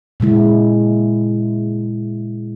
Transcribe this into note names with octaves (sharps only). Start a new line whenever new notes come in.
A#2 C#3 G#3 E4